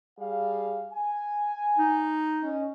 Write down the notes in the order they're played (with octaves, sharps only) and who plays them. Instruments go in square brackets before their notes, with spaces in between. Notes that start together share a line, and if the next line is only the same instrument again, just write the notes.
[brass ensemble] G3 G#4 F5
G#5
[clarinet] D#4
[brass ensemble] C#4 D#5